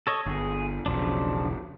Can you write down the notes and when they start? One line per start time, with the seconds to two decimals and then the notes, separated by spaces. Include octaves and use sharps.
0.07 A4 C#5 D#5
0.26 G1 G#4
0.86 E1 B1 C#3 F3 D4